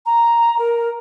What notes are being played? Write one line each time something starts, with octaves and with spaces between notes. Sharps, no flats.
A#5
A#4